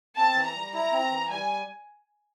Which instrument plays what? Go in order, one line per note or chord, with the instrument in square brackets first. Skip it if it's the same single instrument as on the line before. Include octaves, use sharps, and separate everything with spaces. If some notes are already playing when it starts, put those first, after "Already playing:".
[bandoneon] C4 [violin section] A5
[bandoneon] E3
[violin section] A#5
[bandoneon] G3
[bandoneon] E4 [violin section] A#5
[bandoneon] C4
E3
[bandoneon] G3 [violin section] G#5